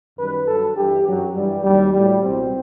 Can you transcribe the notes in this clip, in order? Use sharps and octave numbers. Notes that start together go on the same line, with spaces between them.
F#2 D#3 G3 B4
G2 F#3 A4
G2 E3 G3 G4
F#2 F#3
G2 E3 G3
D#2 D#3 F#3 G3
A2 F#3 G3
C2 B2 G3 C4